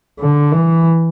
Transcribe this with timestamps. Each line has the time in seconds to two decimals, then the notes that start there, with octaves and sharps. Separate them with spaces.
0.20 D3
0.52 E3